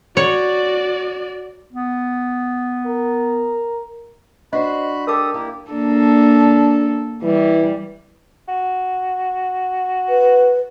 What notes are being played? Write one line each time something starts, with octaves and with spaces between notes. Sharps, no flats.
F#4 C#5 D5
B3
A#4
D4 F#4 C5 D#5 B5 F#6
G4 A4 A#4 D6 D#6
A#3 E4 G4
A#3 D4 A4
E3 G3
F#4
B4